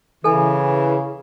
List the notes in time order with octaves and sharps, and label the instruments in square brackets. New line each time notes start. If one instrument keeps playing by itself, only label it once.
[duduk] C#3 [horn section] E3 [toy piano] A4 G#5